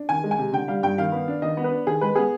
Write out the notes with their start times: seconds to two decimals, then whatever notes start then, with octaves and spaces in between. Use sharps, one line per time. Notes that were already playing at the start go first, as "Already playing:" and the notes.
Already playing: D4
0.09 D#3 G#5
0.24 G#3
0.31 G#5
0.39 C3
0.53 D3 G5
0.68 G3 F5
0.83 G2 G5
0.98 D#3 F5
1.12 B3
1.28 D4
1.42 D#3 D#5
1.57 B3
1.64 B4
1.71 D4
1.87 D#3 G#4
2.01 G#3 B4
2.15 B3 G#4